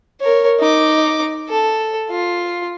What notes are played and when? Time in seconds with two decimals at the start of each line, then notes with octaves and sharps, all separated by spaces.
0.21 A#4 C#5
0.60 D#4 D6
1.49 A4
2.10 F4